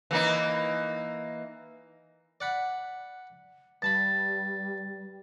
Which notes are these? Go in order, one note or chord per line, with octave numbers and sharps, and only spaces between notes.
E3 A#3 D#4
D5 F#5 B5
G2 G3 A5 B5 A6